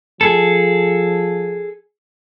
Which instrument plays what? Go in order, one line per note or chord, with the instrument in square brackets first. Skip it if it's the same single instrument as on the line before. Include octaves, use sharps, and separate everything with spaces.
[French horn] F3 [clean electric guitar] G#4 A4